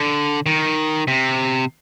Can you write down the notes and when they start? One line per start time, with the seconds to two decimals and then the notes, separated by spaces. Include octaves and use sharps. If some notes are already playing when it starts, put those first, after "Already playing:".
Already playing: D3
0.46 D#3
1.08 C3